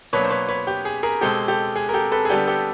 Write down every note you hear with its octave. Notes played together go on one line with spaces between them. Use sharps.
B2 F#3 A#3 D4 B4 C#5
C5
B4 C#5
B4 C#5
G4
G#4
G#4 A#4
B2 G#3 C4 G4 A4
G4 A4
G#4
A#4
G4 A4
A4 B4
G#4
D3 G3 B3 D4 G4 A4
G4 A4